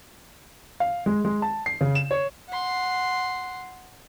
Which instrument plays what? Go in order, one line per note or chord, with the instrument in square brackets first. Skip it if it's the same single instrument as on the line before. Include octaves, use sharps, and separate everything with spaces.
[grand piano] F5
G#3
G#3
A5
C7
C#3
E7
C#5
[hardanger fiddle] F#5 C6